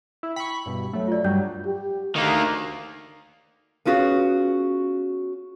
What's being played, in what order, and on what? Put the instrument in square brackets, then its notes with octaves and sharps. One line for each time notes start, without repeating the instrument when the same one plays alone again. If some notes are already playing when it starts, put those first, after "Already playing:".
[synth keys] E4
[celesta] G5 [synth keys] B5 C#6
[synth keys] G2 B2
F#3 A3
[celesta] F4 D5
[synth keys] G2 F#3 G3 [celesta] G6
[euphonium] G4
[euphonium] D2 [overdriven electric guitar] D#3 A#3
[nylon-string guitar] B3 C#4 F4 F#4 G#4